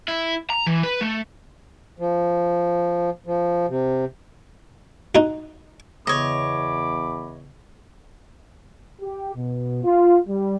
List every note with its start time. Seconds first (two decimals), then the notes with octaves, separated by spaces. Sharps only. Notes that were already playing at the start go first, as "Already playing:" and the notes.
0.08 E4
0.50 A#5
0.67 E3
0.83 B4
1.01 A3
1.99 F3
3.26 F3
3.68 C3
5.15 D#4 F#4
6.07 E2 C#3 B3 C#5 D#5 B5 D6
9.01 G4
9.35 B2
9.84 F4
10.28 G3